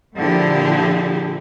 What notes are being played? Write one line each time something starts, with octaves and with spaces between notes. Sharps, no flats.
A#2 D3 F3 E4 G4 G#4